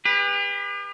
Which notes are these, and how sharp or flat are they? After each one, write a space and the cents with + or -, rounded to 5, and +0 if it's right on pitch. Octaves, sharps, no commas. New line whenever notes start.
G4 +45 B4 -10